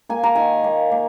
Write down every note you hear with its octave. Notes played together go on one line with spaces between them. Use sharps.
A#3 G#5
A#5
D#3 G#5
A#3
A#3